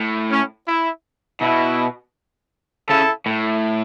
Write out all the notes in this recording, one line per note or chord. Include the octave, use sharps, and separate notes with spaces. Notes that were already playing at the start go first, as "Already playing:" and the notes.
Already playing: A2
C#4
E4
B2 E4
C#3 E4 A4
A2